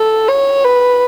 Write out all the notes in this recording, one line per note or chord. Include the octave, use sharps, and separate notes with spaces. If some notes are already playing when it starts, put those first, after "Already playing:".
Already playing: A4
C#5
B4